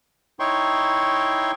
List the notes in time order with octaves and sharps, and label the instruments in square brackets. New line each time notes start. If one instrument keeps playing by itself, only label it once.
[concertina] D#4 E4 C#5 G5 C6 C#6